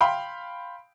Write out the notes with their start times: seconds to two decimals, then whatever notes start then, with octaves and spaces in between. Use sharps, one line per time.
0.01 F5 G5 B5 C6